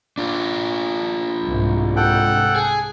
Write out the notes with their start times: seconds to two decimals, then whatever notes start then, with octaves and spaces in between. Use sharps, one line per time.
0.18 D4 F4
1.45 C2 G#2
1.96 A4 F#5 G5
2.56 G#4